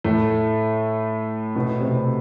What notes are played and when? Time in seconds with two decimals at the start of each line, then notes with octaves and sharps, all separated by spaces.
0.04 A2 A3
1.55 B2 B3
1.80 C3 C4